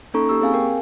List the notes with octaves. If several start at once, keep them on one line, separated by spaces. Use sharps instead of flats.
A#3 C#4 D#4 A4 A#5 C#6
A#3 G4 C#6 E6
C4 G#4 F5 G#5
A#4 G5